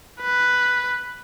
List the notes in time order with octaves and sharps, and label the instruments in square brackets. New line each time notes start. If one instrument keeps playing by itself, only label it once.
[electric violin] B4